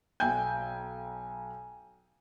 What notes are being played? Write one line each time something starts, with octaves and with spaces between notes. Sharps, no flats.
B1 G5 G#5 G6